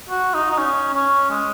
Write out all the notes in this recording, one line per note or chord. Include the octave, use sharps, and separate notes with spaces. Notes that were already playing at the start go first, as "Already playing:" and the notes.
F#4
D#4
D#4
C#4
C#4
G#3